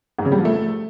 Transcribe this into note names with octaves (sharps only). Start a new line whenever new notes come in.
G#2
C#3
G3
F3
A3